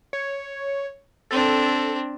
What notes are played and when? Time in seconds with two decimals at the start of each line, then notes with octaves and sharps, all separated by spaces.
0.13 C#5
1.31 C4 D4 A4